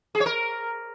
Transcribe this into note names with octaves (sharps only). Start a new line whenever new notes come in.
G#4
C#5
A#4